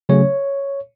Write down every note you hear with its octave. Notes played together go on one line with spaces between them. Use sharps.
C#3 F#3 A3 C#4 C#5